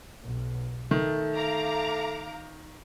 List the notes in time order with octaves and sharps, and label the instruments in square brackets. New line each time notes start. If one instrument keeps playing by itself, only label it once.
[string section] B1
[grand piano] D#3 [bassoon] A3
[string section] F5 A#5 D6